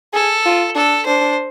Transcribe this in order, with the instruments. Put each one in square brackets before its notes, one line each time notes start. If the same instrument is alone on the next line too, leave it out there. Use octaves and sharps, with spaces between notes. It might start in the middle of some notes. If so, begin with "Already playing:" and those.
[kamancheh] G#4 [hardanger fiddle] A4
[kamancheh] F4
[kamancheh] D4 [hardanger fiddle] A4
[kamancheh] D4 [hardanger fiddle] C5